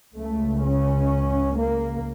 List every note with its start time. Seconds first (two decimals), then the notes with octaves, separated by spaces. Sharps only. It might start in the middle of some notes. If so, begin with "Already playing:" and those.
0.15 C#2 C#3 A3
0.63 C#4
1.57 A#3